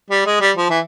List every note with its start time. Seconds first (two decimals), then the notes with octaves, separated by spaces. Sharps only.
0.11 G3
0.26 G#3
0.41 G3
0.57 F3
0.70 E3